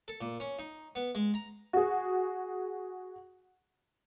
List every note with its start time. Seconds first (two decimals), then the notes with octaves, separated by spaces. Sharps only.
0.08 A4
0.21 A#2
0.40 C#4
0.59 D#4
0.95 B3
1.15 G#3
1.34 A#5
1.73 F#4 G#4